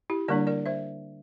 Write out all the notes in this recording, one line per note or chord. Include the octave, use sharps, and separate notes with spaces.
E4 G4
D3 G3 A#3 D4 A#4 D5
A#4 D5
C5 E5